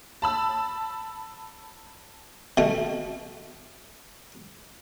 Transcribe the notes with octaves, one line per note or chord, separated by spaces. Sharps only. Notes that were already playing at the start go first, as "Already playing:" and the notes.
A5 B5 E6
B2 A3